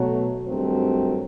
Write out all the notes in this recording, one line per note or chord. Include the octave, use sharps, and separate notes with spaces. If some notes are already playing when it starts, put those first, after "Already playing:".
Already playing: B2 F#3 A3
G2 D#3 F#3 A3 C4